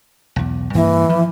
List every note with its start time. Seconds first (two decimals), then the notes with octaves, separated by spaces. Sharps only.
0.36 B1 E2
0.74 G2 E3 A#3
1.09 F3